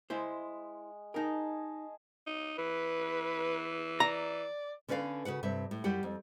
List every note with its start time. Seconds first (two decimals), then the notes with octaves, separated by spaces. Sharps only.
0.10 G#3 E4 C5
1.14 D#4 G#4 A#4 D#5 A5
2.26 D#4
2.58 E3 B4
4.00 D5 A#5
4.88 D3 C#4 B4 D5 F5
5.25 C#3 F#4 B4 F#5
5.43 G2 C3 E5
5.71 A2
5.84 F#2 G3 G4 F#5
6.03 F2